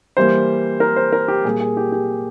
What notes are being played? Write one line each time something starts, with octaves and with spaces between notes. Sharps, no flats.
E3 G3 A#3 C5
A#4
C5
A#4
G4
A#2 G3 A#3 G#4
G#4
G4
G4